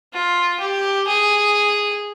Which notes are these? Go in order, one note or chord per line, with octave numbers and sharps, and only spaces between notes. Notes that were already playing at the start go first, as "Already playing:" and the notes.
F4
G4
G#4